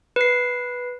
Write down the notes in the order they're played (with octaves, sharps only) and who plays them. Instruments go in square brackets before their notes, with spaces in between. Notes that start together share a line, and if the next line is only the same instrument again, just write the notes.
[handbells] B4 C7